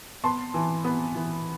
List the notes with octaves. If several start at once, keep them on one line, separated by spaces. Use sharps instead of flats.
B3 A5 C6
E3
B3
E3